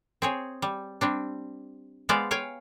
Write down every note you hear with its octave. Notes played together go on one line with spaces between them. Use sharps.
C4 G#4 C#5
G3
G3 C4 D4
G#3 B3 C5 D5 F5
C#5 F5 G5 G#5